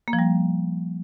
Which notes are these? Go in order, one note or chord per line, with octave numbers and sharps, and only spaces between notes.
A#3
F3
G3